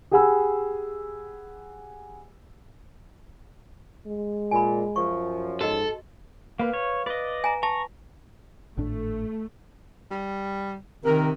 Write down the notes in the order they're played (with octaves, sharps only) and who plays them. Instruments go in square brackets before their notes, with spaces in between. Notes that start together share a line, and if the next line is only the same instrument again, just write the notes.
[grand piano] G4 G#4 F#5 G#5 B5 E6
[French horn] G#3
[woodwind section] A#2 [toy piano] G#5 B5
[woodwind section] F#2 F3 [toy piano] C#6
[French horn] G#2 [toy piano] F#4 D#5 [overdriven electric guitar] A4
[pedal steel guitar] A#3 [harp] B4 F5
[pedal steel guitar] C#5
[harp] B4 [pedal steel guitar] D5 D#5
[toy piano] G#5 A#5
[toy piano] A5 [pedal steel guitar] A#5 C#6
[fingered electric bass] G#1 A2 D4 [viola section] A3
[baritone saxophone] G3
[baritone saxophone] C3 [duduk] D#3 [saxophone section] A#4